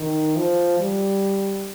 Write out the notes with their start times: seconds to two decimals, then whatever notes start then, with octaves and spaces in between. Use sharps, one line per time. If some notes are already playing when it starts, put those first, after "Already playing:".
Already playing: D#3
0.36 F3
0.80 G3